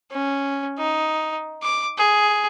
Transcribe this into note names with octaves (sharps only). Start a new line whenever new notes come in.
C#4
D#4
D6
G#4